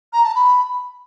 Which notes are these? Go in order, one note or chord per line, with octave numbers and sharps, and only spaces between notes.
A#5
A5
B5